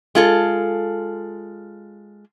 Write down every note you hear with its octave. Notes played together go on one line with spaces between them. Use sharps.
G#3 F4 A4